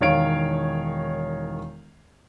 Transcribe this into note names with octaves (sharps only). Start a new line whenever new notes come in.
E1 D#3 C#5 F5 D7